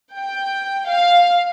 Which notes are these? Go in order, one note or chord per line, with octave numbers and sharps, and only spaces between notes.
G5
F5